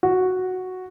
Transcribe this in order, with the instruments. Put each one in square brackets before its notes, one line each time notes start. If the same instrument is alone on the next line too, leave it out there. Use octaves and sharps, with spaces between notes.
[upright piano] F#4